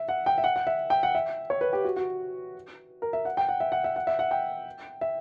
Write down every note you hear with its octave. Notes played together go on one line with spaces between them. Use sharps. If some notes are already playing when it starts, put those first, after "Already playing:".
Already playing: E5
F#5
G5
E5
F#5
F#5
E5
G5
F#5
E5
C#5
B4
G4
F#4
F#4
A#4
E5
F#5
G5
F#5
E5
F#5
E5
F#5
E5
F#5
G5
E5